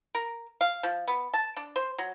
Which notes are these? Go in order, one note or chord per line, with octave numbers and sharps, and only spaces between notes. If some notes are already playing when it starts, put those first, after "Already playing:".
A#4
F5
F3
B3
A5
D4
C5
F#3